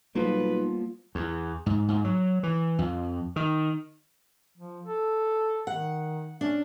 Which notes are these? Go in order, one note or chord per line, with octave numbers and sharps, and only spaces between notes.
B1 F3 G3 A#3 B3 A4 B4
E2
G#2
G#2
F#3
E3
F2
D#3
F3
A4
D#3 F#5
C#4 D4